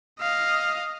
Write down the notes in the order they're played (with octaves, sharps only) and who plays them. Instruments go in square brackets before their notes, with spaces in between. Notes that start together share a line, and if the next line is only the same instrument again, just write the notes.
[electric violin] D#5 F5